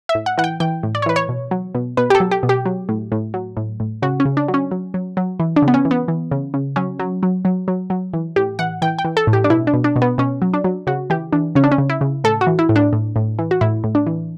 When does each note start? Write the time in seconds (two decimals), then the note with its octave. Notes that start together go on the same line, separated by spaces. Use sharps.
0.09 E5
0.15 A2
0.26 F#5
0.38 E3 F#5
0.44 G5
0.60 E3 G5
0.83 A2
0.95 D5
1.02 C#5
1.06 E3 B4
1.16 C#5
1.29 B2
1.51 F#3
1.75 B2
1.97 B2 B4
2.10 G4
2.15 A4
2.20 F#3
2.31 G4
2.43 B2
2.49 G4
2.66 F#3
2.89 A2
3.12 A2
3.34 F#3
3.57 A2
3.80 A2
4.02 C#3 F#4
4.20 C#4
4.25 C#3
4.37 D4
4.48 F#3
4.54 C#4
4.71 F#3
4.94 F#3
5.17 F#3
5.39 E3
5.56 D4
5.62 C#3
5.68 B3
5.74 C#4
5.85 E3
5.91 B3
6.08 E3
6.31 C#3
6.54 C#3
6.76 F#3 C#4
6.99 F#3
7.23 F#3
7.45 F#3
7.68 F#3
7.90 F#3
8.13 E3
8.36 A2 G4
8.59 E3 F#5
8.82 E3 G5
8.99 G5
9.05 E3
9.17 A4
9.27 A2
9.33 G4
9.44 D4
9.50 B2 E4
9.67 D4
9.73 B2
9.84 D4
9.96 B2
10.02 B3
10.18 B2 C#4
10.42 F#3
10.54 D4
10.64 F#3
10.87 C#3 F#4
11.10 E3 G4
11.33 E3 D4
11.55 C#3 C#4
11.64 D4
11.72 C#4
11.78 C#3
11.90 E4
12.01 C#3
12.24 A2 A4
12.41 F#4
12.47 E3
12.59 E4
12.69 A2
12.76 D4
12.93 A2
13.16 A2
13.39 E3
13.51 F#4
13.61 A2 E4
13.84 A2
13.95 D4
14.07 E3